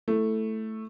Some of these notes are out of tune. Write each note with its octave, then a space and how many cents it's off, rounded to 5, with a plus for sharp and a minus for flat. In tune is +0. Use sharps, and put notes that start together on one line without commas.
A3 +0 E4 +0